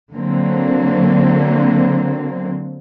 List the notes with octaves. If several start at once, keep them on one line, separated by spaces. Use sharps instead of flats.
D3 F#3 A#3 C4